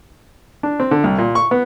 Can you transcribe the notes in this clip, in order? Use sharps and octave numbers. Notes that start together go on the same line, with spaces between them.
D4
C4
D3
C2
A#2
C#6
B3